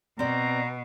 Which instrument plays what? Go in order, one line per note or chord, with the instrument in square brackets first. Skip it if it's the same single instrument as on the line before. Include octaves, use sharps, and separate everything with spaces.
[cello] B2 [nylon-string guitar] C4 D5 [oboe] A#5